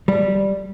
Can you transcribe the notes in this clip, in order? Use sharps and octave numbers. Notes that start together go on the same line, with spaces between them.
G3